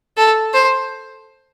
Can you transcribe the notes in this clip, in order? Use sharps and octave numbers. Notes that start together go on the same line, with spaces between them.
A4
C5